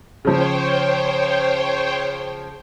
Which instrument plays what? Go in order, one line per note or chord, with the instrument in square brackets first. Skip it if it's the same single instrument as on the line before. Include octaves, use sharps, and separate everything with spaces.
[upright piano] C#3 F3 [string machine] C5 C#5 G5